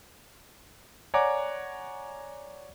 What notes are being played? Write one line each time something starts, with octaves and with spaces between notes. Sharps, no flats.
C#5 D5 F#5 G#5 A#5 D6